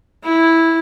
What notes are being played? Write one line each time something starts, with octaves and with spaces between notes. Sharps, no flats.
E4